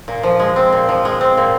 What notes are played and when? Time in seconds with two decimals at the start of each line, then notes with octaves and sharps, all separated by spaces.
0.08 A#2
0.23 F3
0.39 G#3
0.56 C4
0.73 A#2
0.89 F3
1.05 G#3
1.21 C4
1.37 A#2